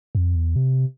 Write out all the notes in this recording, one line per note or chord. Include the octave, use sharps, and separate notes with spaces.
F2
E2
C3